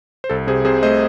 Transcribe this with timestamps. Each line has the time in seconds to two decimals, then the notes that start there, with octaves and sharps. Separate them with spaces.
0.24 C5
0.30 C2 A4
0.47 C3 G#4 C5
0.65 C3 G#4 C5
0.83 A3 C5 D#5